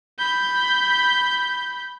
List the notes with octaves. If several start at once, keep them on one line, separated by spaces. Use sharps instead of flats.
B5 G6